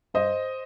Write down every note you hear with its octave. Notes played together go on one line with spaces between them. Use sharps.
G2 C5 D#5